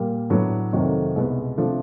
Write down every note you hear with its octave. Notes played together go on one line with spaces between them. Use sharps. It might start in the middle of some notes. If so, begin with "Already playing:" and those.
Already playing: A#2 G3 A#3
A2 F#3 B3 D4
F2 C3 D#3 F#3 A3
C2 B2 G#3 B3
C3 F3 A3 D4